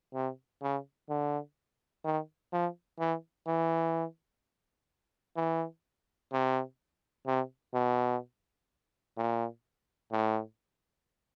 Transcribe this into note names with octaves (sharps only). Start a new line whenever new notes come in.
C3
C#3
D3
D#3
F3
E3
E3
E3
C3
C3
B2
A#2
A2